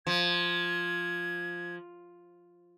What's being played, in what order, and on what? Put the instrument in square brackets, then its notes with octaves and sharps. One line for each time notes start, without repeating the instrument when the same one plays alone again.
[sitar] F3 [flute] G#6